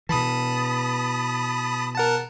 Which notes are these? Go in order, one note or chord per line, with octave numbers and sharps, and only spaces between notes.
B2 E3 A5 B5 D#6
A#4 F#5 A5